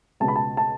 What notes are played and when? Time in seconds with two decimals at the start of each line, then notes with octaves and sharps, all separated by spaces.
0.20 C#2 B2 B3 A5
0.28 B5
0.36 A5
0.57 A5